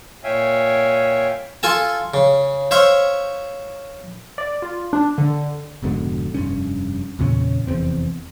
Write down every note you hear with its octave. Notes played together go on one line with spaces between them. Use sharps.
A#2 C#5 E5 F5 G5 G#5
F4 A4 G#5 A5
C#3
C5 C#5 E5 F5
D5
F4
D4
D3
F1 G#2 B2 D3
F1 G2 C#4
E2 A#2 C#3 C#4
F1 E2 C4